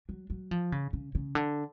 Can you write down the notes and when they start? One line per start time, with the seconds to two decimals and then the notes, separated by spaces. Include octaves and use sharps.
0.09 F#3
0.30 F#3
0.51 F3
0.72 C#3
0.93 C#3
1.15 C#3
1.35 D3